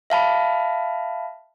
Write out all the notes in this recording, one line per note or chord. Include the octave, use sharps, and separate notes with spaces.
E5 F5 A5 B5